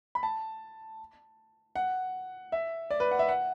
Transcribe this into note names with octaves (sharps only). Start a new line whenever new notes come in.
B5
A5
F#5
E5
D5
B4
F#5
E5
F#5